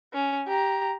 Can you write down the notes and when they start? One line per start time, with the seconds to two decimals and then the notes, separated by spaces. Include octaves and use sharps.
0.13 C#4
0.47 G4 A#5